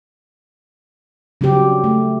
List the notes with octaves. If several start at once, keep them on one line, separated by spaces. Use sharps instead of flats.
C#3 F#3 C4 D4 G4
A3